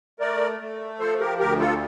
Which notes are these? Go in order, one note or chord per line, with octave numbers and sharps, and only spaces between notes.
A3 A#4 D5
A3
F3 A4 C5
G4 A#4
D2 G4 A#4
F4 A4